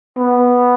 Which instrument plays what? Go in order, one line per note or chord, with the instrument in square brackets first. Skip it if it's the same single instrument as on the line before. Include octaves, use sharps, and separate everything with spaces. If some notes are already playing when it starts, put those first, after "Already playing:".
[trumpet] B3